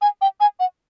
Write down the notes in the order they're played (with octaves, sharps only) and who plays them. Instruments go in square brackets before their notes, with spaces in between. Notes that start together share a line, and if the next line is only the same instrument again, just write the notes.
[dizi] G#5
G5
G#5
F#5